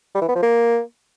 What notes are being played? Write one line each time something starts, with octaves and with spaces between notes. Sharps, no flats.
G3
E3
B3
F3
A#3